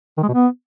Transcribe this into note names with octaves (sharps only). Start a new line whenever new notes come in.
D#3
G#3
B2
B3